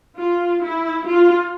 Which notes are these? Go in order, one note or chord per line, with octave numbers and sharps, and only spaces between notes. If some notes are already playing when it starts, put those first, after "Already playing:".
F4
E4
F4